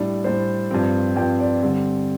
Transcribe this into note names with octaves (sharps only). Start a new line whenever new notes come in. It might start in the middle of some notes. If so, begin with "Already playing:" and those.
Already playing: A2 G3 D4 D5
A2 G3 D4 C5
G2 F3 C4
G2 F3 C4 G5
D5
D3 G3 C4